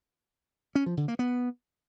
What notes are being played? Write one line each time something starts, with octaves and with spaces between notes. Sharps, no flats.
C#4
F3
D3
A#3
B3